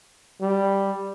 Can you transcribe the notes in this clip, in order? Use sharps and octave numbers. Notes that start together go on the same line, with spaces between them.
G3